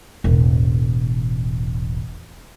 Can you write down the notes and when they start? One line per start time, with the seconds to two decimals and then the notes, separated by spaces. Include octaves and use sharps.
0.24 E1 A1